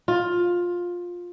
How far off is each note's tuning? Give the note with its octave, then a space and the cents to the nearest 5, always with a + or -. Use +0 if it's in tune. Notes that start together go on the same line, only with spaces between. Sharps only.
F4 +15